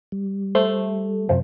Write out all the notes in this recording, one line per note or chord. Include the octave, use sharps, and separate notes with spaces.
G3
A3 C5
F#2 C3 F3 C5